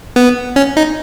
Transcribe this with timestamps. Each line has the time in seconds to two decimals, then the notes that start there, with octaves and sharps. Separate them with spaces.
0.16 B3
0.56 C#4
0.77 D#4